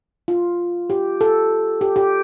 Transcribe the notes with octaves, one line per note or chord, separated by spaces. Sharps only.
F4
G4
A4
G4
G4